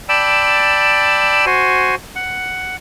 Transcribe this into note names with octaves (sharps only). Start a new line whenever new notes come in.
D5 G5 A5 B5 E6
F#4 C5 G#5
F#5